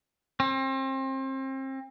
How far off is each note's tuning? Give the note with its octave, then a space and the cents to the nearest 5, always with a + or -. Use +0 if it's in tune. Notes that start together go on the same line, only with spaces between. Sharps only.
C4 +35